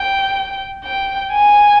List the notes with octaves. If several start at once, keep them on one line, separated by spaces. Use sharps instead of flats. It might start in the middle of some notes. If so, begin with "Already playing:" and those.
Already playing: G5
G5
G#5